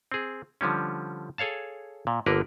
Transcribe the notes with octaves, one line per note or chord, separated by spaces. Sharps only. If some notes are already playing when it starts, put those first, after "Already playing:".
C4 G#4
D3 F3 G3 C#4
G#4 A4 C#5 F5 A5
A#2
G1 D3 A#3 A#4 B4